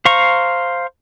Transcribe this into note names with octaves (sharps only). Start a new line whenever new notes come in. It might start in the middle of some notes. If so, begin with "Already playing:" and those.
C5 F5 A#5 C#6